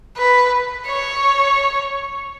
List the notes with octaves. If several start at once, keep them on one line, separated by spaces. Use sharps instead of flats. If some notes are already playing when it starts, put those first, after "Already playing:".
B4
C#5